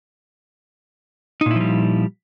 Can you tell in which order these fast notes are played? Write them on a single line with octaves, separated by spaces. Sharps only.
D#4 A#2 E4 F3 G3